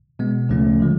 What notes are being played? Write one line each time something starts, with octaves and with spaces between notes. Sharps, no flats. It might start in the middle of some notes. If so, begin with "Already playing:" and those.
B2 G#3 B3
D2 C#3 F3 A3 C#4
D3 F3 G#3